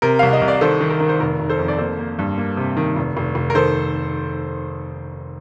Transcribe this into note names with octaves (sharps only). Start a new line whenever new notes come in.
C3 A#4
C2 F5
D#5
C2
D5
D#3 A4 C5
D#3
A#4
D#3
C5
F1 A#4
F1
A4 C5
F2
D5
A#3 A4 C5
A#3
G2
A#3
C3
D#3
F1
F1
F1
A#4
D#3 A4 C5